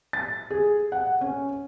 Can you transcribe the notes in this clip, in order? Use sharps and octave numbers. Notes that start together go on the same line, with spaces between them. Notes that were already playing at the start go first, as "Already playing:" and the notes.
A6
G#4
F#5
C#4